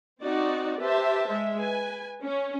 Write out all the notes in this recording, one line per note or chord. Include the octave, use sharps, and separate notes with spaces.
C4 D#4 F#4 D5
G4 B4 C5 E5 A5
G#3 E5
B4 G#5
C#4